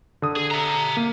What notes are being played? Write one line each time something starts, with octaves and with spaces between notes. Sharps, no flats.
D3 D#6
G#4
E5 A#5
A#3